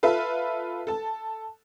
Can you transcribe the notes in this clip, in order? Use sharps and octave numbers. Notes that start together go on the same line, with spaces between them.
F4 A4 B4 E5
A4 A5